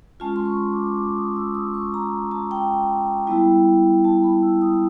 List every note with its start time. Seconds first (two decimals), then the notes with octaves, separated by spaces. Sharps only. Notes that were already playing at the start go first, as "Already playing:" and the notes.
0.20 G#3 C#4 F4 A5
0.36 C6
0.46 C#6
0.72 D6
0.97 D6
1.16 D#6
1.36 E6
1.55 D#6
1.74 C#6
1.94 A#5
2.31 A5
2.51 G5
3.27 G3 B3 E4
4.05 A5
4.24 B5
4.43 E6
4.62 D#6